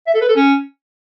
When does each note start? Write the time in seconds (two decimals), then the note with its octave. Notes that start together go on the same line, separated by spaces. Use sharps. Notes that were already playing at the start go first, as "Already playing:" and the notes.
0.07 E5
0.14 A4
0.21 B4
0.29 A4
0.36 C#4